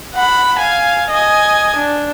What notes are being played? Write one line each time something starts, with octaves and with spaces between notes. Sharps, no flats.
F#5 B5
F5 G#5
D#5 G#5
D4